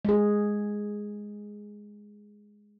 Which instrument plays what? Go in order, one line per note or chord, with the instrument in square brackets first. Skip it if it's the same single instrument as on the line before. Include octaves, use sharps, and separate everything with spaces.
[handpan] G#3 G#4